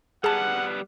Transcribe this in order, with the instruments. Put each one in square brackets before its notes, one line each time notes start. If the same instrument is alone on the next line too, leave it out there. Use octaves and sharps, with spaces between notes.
[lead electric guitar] G3 B3 [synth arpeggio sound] G#4 A5 [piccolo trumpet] F#5